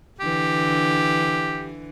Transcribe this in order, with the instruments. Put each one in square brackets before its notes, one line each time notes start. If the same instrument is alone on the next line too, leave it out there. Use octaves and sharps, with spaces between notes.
[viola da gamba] D3 E3 [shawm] G4